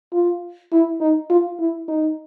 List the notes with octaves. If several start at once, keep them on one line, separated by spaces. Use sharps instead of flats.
F4
E4
D#4
F4
E4
D#4